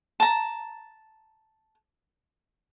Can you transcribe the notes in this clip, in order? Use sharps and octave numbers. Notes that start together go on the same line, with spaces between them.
A5 A#5